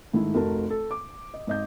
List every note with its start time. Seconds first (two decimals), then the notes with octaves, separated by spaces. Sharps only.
0.13 G#2 D#3 A3 E4
0.35 F1 F#4 A#4 A5
0.70 A4
0.91 D6
1.34 D#5
1.47 G#1 D#5 G6